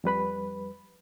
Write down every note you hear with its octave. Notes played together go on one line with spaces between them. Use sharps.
F2 G3 B4 B5